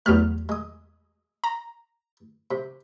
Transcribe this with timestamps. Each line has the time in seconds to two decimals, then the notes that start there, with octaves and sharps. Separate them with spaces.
0.06 E2 F#3 G3 A3 F6
0.49 G#3 D#6
1.44 A#5
2.51 C3